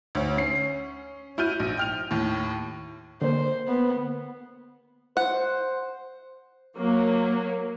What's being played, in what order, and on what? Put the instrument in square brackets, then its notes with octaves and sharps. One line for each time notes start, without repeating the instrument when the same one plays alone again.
[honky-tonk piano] D2 C#5
C#4 C7
E4 F#4 F6 G6 D#7
A#1
G5 F6 F7
D#2 A2
[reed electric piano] D3 A#3 [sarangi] C5
[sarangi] B3
[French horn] C5 [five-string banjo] F#5
[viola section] F#3 A#3